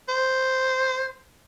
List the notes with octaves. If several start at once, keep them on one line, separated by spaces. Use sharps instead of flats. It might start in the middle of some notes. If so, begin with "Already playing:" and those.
C5